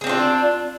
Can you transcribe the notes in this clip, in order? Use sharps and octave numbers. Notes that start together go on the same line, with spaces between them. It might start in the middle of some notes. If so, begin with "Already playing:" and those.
C4 D4 F4 G#4